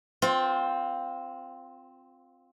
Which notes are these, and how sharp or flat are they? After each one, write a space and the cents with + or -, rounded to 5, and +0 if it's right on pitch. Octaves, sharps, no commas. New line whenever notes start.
C4 +0 F4 +20